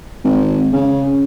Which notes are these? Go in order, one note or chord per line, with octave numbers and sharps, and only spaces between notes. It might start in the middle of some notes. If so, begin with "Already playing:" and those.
G#1
C#3